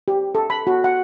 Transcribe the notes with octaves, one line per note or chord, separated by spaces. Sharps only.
G4
A4
B5
F#4
F#5